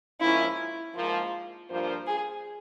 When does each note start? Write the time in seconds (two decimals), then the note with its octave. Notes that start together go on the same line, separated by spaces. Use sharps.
0.20 G#2 F3 A#3 C#4 E4 F4
0.95 G#2 F3 A#3 F4
1.69 G2 F3 A#3 F4 C5
2.07 G#4